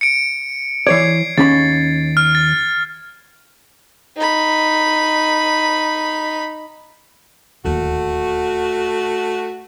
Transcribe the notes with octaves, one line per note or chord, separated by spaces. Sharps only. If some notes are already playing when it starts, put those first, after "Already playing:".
C#7 D7
E3 C#5 D5 G#6 C7
D#2 C#4 B5 A6
F6
A6
D#4 B5
D1 D#2 A3 F#4